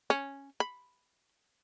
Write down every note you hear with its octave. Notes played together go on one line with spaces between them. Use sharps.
C#4
B5